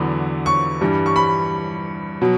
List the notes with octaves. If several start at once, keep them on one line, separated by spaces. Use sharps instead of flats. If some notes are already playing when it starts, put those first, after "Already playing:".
Already playing: E2 D3 F#3 B3 E4
C#6
G2 E3 G3
C#6
B5
B2 F#3